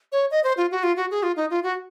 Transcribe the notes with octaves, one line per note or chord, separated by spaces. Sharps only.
C#5
D#5
C5
F4
F#4
F4
F#4
G#4
F4
D#4
F4
F#4